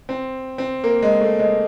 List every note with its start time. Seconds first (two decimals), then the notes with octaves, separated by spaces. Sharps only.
0.09 C4
0.58 C4
0.84 A#3
1.02 G#3
1.21 A3
1.39 G#3